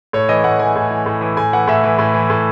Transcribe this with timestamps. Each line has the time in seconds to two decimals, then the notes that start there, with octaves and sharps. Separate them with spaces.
0.13 A2 C#5
0.29 E3 D#5
0.44 A2 F#5
0.60 E3 G#5
0.76 A2
0.91 E3
1.06 A2
1.21 E3
1.37 A2 G#5
1.53 E3 F#5
1.68 A2 E5
1.84 E3
1.99 A2
2.14 E3
2.30 A2